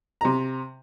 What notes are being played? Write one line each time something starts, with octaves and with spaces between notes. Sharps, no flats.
C3 A#5